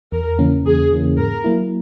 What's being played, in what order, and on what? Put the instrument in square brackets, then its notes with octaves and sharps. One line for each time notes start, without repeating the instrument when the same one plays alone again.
[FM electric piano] E2 [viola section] A#4
[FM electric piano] C#3 E3 A#3 C#4
[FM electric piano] E2 [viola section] G#4
[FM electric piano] C#3 E3 A#3 C#4
[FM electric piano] G#2 [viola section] A#4
[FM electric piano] F#3 A#3 E4